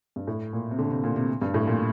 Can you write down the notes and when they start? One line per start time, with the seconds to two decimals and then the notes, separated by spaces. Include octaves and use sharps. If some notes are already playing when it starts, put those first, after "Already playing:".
0.16 G2
0.27 A2
0.53 A#2
0.71 C3
0.78 D3
0.90 C3
1.04 A#2
1.16 C3
1.42 G2
1.54 A2
1.67 A#2